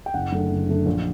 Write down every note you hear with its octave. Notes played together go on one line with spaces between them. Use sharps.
G5
F#1 F#5
F#2 D3 A3
F#1
F#2 D3 A3
A#1